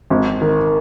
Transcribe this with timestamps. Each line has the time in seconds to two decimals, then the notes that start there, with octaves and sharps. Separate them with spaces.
0.10 G#1
0.42 D#3